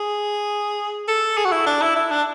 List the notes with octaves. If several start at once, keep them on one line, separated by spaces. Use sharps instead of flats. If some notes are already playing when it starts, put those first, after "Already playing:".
Already playing: G#4
A4
G#4
F#4
E4
D4
E4
E4
D4